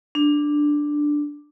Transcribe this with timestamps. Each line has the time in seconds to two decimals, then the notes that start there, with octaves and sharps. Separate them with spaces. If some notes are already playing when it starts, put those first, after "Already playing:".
0.15 D4